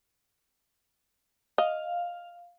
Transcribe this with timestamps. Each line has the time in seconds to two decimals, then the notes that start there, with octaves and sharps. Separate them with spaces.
1.58 D#5 F5